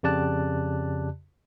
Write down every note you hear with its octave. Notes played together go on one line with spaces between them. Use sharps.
F2 C#3 G4 D5 A5 F#6